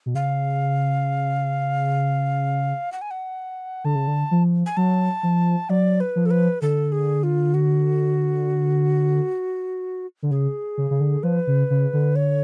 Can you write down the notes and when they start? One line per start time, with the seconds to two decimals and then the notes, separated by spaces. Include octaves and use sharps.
0.06 B2
0.15 C#3 F5
2.92 F#5
3.02 G#5
3.11 F#5
3.84 D3 A5
3.95 C#3
4.07 D3
4.31 F3
4.66 G#5
4.77 F#3 A5
5.23 F3
5.69 F#3 D5
6.00 B4
6.16 F3
6.26 A4
6.31 B4
6.62 D3 A4
6.92 G#4
7.23 F4
7.54 F#4
10.23 D3
10.31 C#3 G#4
10.78 C#3
10.91 C#3
11.01 D3
11.23 F3 B4
11.47 C#3
11.70 C#3
11.93 D3
12.16 C#5